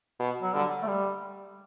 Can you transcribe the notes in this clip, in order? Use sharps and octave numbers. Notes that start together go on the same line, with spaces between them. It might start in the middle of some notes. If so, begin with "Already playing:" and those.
B2
F#3
D3 G3
A3
G3